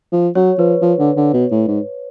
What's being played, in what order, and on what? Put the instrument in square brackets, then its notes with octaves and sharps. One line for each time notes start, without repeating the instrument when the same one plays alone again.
[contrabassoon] F3
[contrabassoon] F#3 [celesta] C#5
[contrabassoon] F3 [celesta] B4
[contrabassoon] F3
D3
D3
B2
A2
G#2